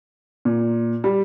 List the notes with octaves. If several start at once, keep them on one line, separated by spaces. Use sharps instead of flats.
A#2
G3